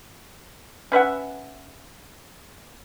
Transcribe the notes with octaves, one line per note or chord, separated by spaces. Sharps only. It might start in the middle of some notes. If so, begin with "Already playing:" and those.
C#4 B4 E5 F#5